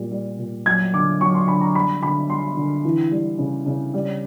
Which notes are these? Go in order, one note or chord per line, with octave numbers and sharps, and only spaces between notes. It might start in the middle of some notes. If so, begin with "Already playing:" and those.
Already playing: A#2 G3
G3
A#2
F#3 G#6
D3 D6
F#3 C#6
C6
D3 B5
A#5
G3 B5
D3 B5
G3 C6
D3
E3
G3
C#3
C#3
G3